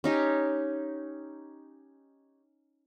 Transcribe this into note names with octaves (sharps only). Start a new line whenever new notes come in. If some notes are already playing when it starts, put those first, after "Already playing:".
C#4 D#4 G4